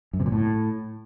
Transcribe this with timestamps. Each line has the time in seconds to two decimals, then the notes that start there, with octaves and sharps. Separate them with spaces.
0.13 F#2
0.20 C3
0.26 A#2
0.32 A2